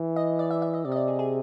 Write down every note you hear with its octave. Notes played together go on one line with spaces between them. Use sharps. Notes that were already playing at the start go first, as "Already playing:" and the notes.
Already playing: E3
D#5
D5
E5
E5
D#5
C3 D5
D#5
D5
G#4
G#4